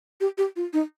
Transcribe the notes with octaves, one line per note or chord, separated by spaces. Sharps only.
G4
G4
F4
D#4